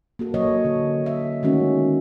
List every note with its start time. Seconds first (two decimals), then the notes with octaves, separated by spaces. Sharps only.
0.19 A#3 F#4 A4
0.34 F#3 A4 C#5 D#5
0.65 D3
1.04 A#3 E5
1.43 D#3 G#3 A3 C#4 F#4 A#4